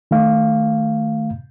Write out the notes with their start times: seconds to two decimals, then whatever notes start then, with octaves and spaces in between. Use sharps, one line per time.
0.11 D#3 A3 F5